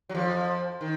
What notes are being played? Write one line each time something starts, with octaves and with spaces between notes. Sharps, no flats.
F#3
F2 F3
D#3